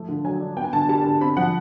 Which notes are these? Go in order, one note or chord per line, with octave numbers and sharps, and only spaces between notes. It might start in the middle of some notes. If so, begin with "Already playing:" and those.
Already playing: F3 A3
D3
F#3 G#5
D4
B3 G5
G#5
D3 A5
G#5
G3 A5
D3
C4 B5
F3 F#5